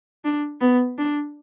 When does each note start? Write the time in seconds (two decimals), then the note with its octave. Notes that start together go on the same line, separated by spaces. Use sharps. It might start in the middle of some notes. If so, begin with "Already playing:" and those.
0.25 D4
0.61 B3
0.98 D4